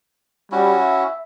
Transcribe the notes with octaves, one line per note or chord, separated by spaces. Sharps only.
G3 C#4 E4 F#4
E5